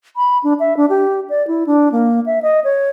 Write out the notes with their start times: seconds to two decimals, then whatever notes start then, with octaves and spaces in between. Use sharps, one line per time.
0.16 B5
0.44 D4
0.60 E5
0.77 D4
0.89 G4
1.30 D5
1.47 E4
1.67 D4
1.92 A#3
2.26 E5
2.42 D#5
2.64 C#5